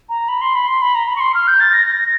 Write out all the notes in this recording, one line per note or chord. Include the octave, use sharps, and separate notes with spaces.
A#5
B5
C6
B5
C6
B5
A#5
B5
C#6
C6
F6
G6
A6
A#6
A#6